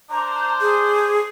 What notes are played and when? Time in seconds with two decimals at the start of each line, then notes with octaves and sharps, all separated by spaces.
0.11 D4 C5 A#5
0.61 G#4